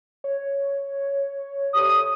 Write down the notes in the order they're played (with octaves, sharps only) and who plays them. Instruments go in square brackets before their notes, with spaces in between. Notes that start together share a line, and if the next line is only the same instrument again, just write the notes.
[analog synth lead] C#5
[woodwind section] D2 G4 D#6